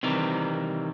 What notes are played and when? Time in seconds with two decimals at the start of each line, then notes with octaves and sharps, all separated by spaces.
0.03 C3 D#3 E3 G3